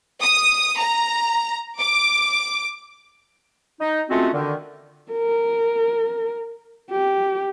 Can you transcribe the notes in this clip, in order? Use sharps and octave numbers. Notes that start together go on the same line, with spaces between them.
D#6
A#5
D6
D#4
G#3 A3 C4 C#4 F4 F#4
D3 D#3
A#4
G4